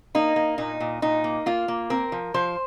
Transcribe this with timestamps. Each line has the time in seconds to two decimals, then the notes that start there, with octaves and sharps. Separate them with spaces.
0.15 A#3 D#4
0.36 A#3
0.58 A#2 D#4
0.80 A#2
1.02 A#2 D#4
1.24 A#3
1.46 A#3 F4
1.68 A#3
1.90 C4 A#4
2.12 F3
2.34 F3 C5